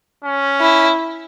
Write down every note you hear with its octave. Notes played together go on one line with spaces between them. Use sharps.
C#4
E4